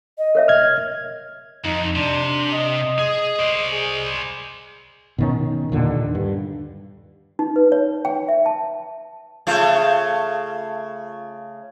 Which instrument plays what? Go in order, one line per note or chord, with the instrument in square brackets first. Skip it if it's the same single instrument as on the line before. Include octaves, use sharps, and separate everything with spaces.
[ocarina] D#5
[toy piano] A#4 C#5 E5
[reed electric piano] F6 G#6
[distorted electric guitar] F2 [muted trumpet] D#4
[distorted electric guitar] C3 [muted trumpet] D4
[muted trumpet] D#5
[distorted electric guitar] G#4
C5 D5
[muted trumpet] G#4
[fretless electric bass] B2 D#3 C#4
D#2 A#2 D3 D#3
G2
[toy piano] D#4
B4
C#5
G5
E5
A5
[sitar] C#3 A3 F4